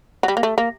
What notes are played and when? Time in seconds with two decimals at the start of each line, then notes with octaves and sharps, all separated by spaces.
0.23 F#3
0.28 G3
0.37 A#3
0.43 A3
0.58 A#3